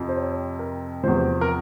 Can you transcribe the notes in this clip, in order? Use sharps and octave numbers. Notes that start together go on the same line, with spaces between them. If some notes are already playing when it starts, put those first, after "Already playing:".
Already playing: F2 C3 F3
C5
C#5
A#4
E2 C3 F3 C5
A#4